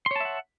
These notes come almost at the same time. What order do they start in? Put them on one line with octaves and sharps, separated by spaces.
C6 C#5 A5 E5 F#5